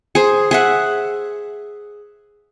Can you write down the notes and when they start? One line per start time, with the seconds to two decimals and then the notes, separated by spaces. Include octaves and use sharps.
0.15 G#4 C5
0.51 G#4 E5 F#5